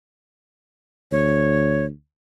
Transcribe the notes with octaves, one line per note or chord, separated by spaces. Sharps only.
D2 C#5